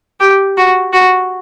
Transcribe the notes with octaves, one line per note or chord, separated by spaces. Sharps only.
G4
F#4
F#4